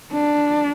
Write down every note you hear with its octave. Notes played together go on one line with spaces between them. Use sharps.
D4